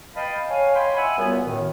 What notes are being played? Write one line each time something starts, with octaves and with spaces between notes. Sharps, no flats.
B4 D#5 F5 G5 A5 B5
C#5 F5 G#5
C#5 D#5 G5 G#5 B5 C6
E5 F#5 G#5
C#2 F#2 G3 B3
F#2 A2 D#3